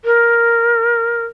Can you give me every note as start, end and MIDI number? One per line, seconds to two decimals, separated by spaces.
0.05 1.26 70